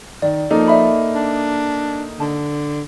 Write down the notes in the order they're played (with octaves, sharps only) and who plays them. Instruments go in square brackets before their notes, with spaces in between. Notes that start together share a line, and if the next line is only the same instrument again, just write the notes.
[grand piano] D#3 [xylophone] D5
[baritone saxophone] F3 [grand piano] A#3 D#4 A4
[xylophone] D5 E5 B5
[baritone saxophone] D4
[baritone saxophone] D3 [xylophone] A5